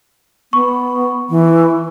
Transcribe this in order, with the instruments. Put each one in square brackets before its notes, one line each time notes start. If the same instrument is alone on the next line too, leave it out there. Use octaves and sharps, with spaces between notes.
[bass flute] B3 [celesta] C#6
[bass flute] E3